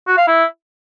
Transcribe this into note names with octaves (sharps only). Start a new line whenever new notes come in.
F#4
F5
E4